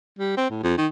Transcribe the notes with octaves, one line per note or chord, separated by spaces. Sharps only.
G3
C4
A2
F2
D#3